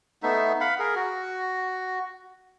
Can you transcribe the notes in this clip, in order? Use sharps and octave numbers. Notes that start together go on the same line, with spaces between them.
A3 B3 D#4 E5
F5 F#5 B5
G#4 A#4
F#4